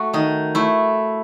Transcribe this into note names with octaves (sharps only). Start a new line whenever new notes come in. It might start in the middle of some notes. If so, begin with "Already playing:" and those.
Already playing: A3 F#4
D#3 D#4
A3 E4